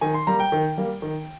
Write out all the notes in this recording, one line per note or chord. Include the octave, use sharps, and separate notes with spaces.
D#3 G#5
C6
G3 A#3 A#5
G5
D#3
G3 A#3
D#3